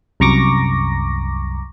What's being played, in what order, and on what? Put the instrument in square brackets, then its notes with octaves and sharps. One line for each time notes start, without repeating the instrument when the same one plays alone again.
[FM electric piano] C2 F#2 A#5 C#6 D6 A#6